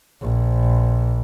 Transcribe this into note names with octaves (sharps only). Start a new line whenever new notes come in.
A#1